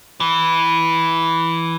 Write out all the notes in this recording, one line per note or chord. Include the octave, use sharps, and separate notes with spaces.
E3